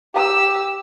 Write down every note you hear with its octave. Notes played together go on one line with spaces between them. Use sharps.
G4 E6